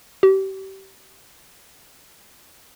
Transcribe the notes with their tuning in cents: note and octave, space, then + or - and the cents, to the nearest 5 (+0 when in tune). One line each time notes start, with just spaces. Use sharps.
G4 -30